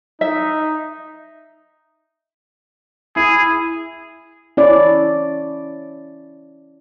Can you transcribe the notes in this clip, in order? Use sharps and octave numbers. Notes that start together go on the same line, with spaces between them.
D#4 E5
E4 G#4
C#4 E4 D5